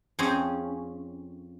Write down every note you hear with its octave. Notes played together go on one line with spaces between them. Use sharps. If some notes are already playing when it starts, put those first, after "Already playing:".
F2 C4 C#4 G#4 C5